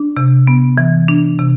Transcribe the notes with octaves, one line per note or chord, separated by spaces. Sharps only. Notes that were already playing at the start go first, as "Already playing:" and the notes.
Already playing: D4
C3
B3
E3
D4
C3